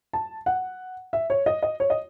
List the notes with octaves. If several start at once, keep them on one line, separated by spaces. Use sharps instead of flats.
A5
F#5
E5
C#5
D#5
D#5
C#5
D#5